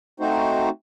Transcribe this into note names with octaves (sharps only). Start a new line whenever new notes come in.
A3 C4 D#4 F#4 C5